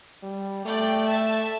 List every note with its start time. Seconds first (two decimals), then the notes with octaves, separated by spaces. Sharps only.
0.23 G3
0.65 A3 D5 G5
1.08 E5 A5